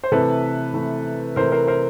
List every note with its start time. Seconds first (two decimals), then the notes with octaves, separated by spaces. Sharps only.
0.04 C5
0.12 C3 E3 A3 A4 B4
0.74 C3 E3 A3
1.36 C3 E3 A3 A#4 C5
1.52 A#4 C5
1.67 A#4 C5